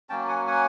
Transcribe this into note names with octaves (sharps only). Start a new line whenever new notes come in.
F#3 A#3 C#4 G5 A5
F#5 G#5
F#5 G#5